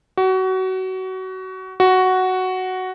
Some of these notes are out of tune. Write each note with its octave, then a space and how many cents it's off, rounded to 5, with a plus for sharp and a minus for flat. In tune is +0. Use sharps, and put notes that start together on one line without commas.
F#4 +25
F#4 +5